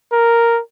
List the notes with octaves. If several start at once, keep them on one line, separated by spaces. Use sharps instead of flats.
A#4